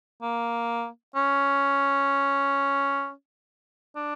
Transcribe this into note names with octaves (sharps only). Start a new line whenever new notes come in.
A#3
C#4
D4